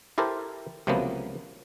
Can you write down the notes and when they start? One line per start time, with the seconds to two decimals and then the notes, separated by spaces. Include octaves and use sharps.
0.18 E4 G4 A4 A#4 C5
0.87 C#2 C3 F3 F#3 A#3 B3